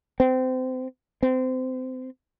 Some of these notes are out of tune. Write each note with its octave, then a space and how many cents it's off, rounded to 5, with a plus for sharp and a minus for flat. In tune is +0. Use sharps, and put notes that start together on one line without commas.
C4 -25
C4 -25